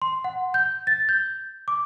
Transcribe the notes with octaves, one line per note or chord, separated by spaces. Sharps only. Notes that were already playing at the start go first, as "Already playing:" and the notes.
C6
F#5
G6
A6
G6
D6